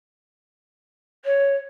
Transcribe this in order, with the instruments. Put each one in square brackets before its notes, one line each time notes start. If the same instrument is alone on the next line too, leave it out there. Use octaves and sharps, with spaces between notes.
[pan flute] C#5